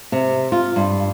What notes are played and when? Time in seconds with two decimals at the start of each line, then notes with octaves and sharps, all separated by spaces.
0.12 C3
0.52 F4
0.76 G2